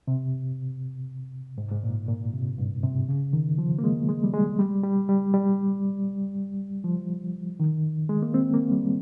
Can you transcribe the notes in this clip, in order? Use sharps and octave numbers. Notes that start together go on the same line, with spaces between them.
C3
G#2
G#2
A#2
A#2
C3
G2
C3
C#3
D#3
F3
A#3
G#3
G#3
G3
G#3
G3
G3
G3
G3
F3
D#3
G#3
A#3
C4
A#3
G3